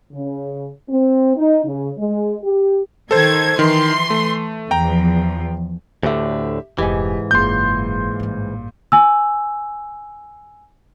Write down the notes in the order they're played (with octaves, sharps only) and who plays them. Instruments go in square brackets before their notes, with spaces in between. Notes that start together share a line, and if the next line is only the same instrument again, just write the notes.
[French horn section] C#3
C4
D#4
C#3
G#3
G4
[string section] D#3 G#6 [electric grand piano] A4 C5
[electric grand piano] D#3 [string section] E3 C6
[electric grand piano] A3
[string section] E2 F3 [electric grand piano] G5 A#5
[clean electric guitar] D2 A2 D3 [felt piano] G4 E5
[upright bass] F1 E4 [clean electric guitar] G#2 E3 [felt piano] G4 D#5 G#5
[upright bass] F#1 F#3 [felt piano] A#2 C#3 [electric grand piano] C6 G6
[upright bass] A1 G2
[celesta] G#5 E6